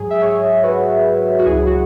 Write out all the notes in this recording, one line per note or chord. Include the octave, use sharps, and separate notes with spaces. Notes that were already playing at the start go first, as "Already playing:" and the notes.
Already playing: G#2 F#3 G#4
E5
G#4 C#5
F#4 B4
F#4
C#2 C#3 F#3 E4 G#4
F#4